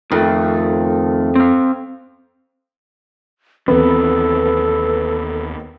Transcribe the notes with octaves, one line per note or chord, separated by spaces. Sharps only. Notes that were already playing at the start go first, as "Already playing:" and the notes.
F2 D#3 A3
C4 F5
D#2 E3 B3 C4 A4